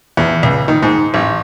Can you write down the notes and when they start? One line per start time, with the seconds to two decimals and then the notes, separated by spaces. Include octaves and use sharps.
0.17 E2
0.43 C#2
0.68 D#3
0.82 G#2
1.14 A1